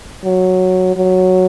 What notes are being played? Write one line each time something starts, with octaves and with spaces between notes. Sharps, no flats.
F#3
F#3